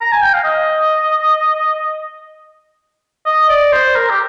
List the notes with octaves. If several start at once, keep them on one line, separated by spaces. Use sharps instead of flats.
A#5
G#5
G5
F5
D#5
D#5
D5
C5
A#4
G4